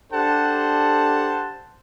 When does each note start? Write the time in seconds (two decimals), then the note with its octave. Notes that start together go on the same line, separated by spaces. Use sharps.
0.13 D4 G4 A4 C5 F#5 A5